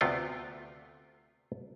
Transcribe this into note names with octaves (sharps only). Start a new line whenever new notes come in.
D2 C3 A3 B3 F4 G5